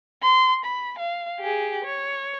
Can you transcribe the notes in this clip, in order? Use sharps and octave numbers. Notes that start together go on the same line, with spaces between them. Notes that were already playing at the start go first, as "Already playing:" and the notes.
C6
B5
F5
G4 G#4
C#5